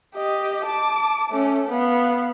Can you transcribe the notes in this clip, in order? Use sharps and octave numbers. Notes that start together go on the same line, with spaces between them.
G4 D#5
A5 D6
A3 C#4
B3 F5